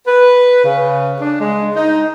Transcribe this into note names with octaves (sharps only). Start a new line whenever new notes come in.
B4
C#3
D4
G#3
D#4